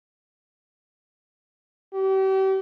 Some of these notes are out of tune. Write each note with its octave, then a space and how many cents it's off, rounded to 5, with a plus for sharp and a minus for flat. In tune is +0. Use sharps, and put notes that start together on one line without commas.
G4 -35